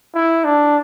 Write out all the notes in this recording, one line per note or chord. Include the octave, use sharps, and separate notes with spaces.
E4
D4